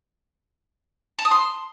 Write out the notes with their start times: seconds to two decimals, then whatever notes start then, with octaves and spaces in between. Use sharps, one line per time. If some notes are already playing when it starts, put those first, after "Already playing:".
1.19 A5
1.25 D#6
1.31 C6